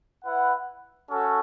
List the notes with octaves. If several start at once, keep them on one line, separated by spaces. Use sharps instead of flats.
E4 B4 F#5
C#4 F#4 A4